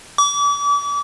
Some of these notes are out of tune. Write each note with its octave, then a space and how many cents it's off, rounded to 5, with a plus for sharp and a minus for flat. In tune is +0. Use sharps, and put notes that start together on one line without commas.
D6 -40